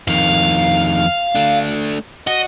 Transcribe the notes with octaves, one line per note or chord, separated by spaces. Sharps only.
F2 D#3 F5
A3 D4
F#4 D#5